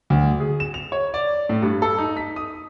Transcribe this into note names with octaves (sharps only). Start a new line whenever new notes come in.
D2
G#4
E7
F7
C#5
D5
A2
G2
A4
D#4
B6
D#6